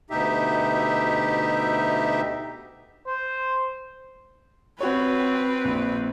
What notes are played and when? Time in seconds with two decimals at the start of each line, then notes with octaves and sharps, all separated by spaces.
0.10 D2 B2 D#4 G4 E5
3.07 C5
4.81 C4 F#4 B4 C#5
5.65 A#1